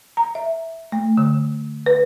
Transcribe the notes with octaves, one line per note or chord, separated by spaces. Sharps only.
A#5
E5
A3
D3
B4